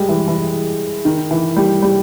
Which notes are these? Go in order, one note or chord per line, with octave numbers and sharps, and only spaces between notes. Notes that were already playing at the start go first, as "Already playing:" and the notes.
Already playing: G3 G#3
E3
E3
D#3
E3
G3
G3